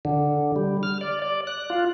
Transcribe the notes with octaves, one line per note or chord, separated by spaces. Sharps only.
D3
G3
F6
D5
D5
F#6
F4